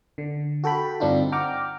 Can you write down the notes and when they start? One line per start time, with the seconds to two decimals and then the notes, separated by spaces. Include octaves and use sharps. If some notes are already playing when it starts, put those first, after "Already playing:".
0.18 D3
0.64 F#4 A4 G5 B5
1.00 G2 D3 C4 D4 D#4 F4
1.32 F#5 G5 A#5 D6 F6